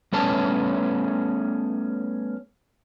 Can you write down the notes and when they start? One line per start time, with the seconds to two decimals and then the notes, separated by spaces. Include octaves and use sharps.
0.12 G3 A3 B3 C#4 C#5 A5